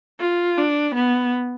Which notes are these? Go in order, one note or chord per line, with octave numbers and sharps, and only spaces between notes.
F4
D4
B3